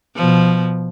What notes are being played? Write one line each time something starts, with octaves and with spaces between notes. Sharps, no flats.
B2 F3